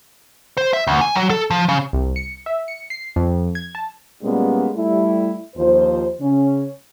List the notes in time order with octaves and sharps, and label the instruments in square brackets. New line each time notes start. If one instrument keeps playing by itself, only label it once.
[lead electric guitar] C5
E5
D2
G#5
F#3
A4
F3
C#3
[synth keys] C2
C#7
E5
C#7
C7
F2
G#6
A5
[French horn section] A#2 G3 G#3 A#3 B3 C#4
G3 A3 E4
D#2 F3 F4 C5
C#3 C#4